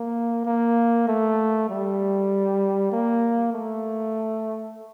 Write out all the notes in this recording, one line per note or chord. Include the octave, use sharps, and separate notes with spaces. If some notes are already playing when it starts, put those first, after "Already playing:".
Already playing: A#3
A#3
A3
G3
A#3
A3